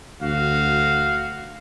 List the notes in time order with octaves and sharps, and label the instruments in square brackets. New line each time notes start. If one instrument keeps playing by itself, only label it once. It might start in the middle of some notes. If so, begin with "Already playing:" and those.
[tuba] D2 [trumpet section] F#4 F5